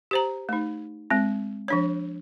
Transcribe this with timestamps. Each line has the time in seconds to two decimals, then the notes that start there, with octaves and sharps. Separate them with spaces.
0.11 G4 C5 A#5
0.49 A3 D#4
1.10 G#3 C4
1.68 F3 D4 C#5